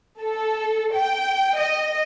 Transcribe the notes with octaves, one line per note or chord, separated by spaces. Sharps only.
A4
G5
D#5